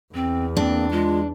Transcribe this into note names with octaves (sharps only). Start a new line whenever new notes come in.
E2 C4
A#3 C4 D4
G#3 F4